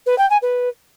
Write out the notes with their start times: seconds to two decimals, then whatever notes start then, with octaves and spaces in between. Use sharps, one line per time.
0.06 B4
0.18 G5
0.30 G#5
0.42 B4